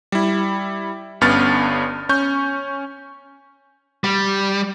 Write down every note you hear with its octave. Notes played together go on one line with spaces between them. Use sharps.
G3 E4
G1 G2 B3 C#4 F6 A6
C#4 C#6 G6
G3